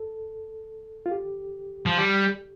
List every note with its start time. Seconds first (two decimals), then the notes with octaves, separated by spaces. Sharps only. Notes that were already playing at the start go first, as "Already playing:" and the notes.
Already playing: A4
1.06 F4
1.11 G4
1.86 F3
1.98 G3